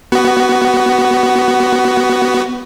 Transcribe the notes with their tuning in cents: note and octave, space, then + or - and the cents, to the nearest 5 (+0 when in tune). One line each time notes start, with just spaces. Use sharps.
B3 +0 F#4 +20